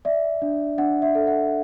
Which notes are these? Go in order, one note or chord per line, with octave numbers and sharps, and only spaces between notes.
D5 E5
D4
D4 F#5
E5
A4
F#5